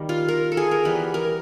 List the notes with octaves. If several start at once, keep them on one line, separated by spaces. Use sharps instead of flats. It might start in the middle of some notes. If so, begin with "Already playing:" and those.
Already playing: D#3 G3 A#3
F4
A#4
A4
G#4
A#4
E3 G3 B3 B4
A#4